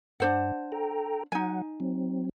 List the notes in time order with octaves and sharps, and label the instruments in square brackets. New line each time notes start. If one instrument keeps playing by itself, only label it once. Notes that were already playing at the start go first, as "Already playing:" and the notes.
[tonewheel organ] G2 [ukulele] D4 C5 F#5
[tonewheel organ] A4 G5 A#5
[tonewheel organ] F#3 F#5 [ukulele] D#4 G#5
[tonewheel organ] F#3 C4